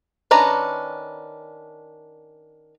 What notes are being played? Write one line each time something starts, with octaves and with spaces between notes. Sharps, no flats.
D#3 C#4 D4 B4 A#5